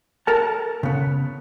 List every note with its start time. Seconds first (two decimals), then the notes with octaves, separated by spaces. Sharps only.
0.27 A4 A#4 A5
0.83 C#3 B3